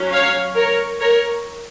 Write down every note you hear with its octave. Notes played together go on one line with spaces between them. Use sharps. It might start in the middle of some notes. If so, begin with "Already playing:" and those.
Already playing: F#3 C#4
C#5 F5
A#4 C#5
A#4 C#5